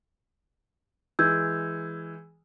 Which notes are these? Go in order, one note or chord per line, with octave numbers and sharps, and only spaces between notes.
E3 G#3 E6 G6 G#6